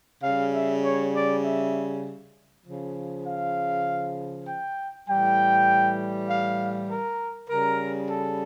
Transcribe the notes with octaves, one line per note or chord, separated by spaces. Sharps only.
C#3 G3 F5
E5
C#5
D5
E5
C#3 F3
F5
G5
A2 E3 G3 G5
F5
A#4
C#3 G3 A#4
A4